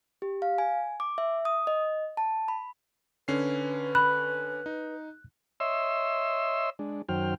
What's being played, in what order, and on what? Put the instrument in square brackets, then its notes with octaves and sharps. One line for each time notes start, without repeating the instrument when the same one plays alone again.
[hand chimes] G4
F5
G#5
D6
E5
D#6
D#5
A5
B5
[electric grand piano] D3 C#4 C7 [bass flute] B4
[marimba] B5 [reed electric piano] F#6
[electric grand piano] D#4
[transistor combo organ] C#5 D#5 E5 C6 E6
G#3 D4
F#2 D#3 F#3 C5 G5 F6